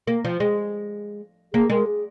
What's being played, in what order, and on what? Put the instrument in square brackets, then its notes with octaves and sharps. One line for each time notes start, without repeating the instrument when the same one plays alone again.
[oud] A#3
F3
[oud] G#3 [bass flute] G#4
[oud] A#3 [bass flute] G#4
[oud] G#3 [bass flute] A#4
[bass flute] G#4